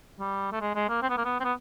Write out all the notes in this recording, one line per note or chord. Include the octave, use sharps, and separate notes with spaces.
G3
A3
G#3
G#3
A#3
C4
B3
A#3
B3
C4
B3